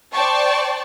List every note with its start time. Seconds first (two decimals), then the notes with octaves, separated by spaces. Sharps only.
0.13 C5 D5 G5 A5 C#6